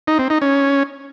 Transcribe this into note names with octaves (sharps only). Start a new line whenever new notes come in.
D#4
C4
D#4
C#4